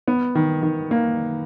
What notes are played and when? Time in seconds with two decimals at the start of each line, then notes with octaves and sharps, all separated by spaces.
0.08 B3
0.35 D#3
0.63 D#3
0.91 A#3